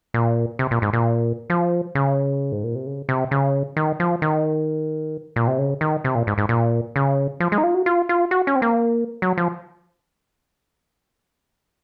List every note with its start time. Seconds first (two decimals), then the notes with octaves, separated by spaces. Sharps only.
0.14 A#2
0.59 C3
0.71 A#2
0.82 G#2
0.93 A#2
1.50 F3
1.95 C#3
2.52 G#2
2.64 A#2
2.75 C3
2.86 C#3
3.09 C3
3.31 C#3
3.77 D#3
4.00 F3
4.22 D#3
5.36 A#2
5.47 C3
5.58 C#3
5.81 D#3
6.04 C3
6.15 A#2
6.27 G#2
6.38 G#2
6.49 A#2
6.96 C#3
7.40 F3
7.52 G#3
7.58 D#4
7.64 F4
7.75 F#4
7.86 F4
8.09 F4
8.31 F#4
8.47 C#4
8.56 C4
8.62 A#3
9.22 F#3
9.38 F3